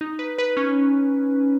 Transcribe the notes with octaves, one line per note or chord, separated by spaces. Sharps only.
D#4
B4
B4
C#4